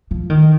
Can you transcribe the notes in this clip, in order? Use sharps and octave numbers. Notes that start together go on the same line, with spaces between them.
F3
D#3